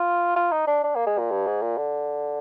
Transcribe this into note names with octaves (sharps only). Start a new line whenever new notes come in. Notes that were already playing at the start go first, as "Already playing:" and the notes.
Already playing: F4
F4
D#4
D4
D4
A#3
G#3
A#2
G2
G#2
A#2
D3